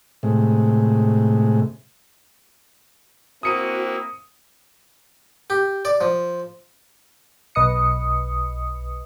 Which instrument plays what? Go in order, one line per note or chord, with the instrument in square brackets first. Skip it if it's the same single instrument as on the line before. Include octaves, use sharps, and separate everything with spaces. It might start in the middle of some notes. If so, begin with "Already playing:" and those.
[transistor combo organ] A2 C3 G#3
[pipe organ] A#3 E4 [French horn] C4 [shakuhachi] F#4 [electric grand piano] D#6 C#7 D#7
[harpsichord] G4
D5
F3
[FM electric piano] B1 B4 D#5 D#6 C#7